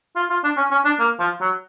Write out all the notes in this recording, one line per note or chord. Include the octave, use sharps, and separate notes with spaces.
F4
F4
D4
C#4
C#4
D4
A#3
F3
F#3